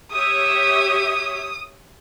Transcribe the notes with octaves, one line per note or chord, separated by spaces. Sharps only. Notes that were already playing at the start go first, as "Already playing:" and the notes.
G4 C#5 E5 D#6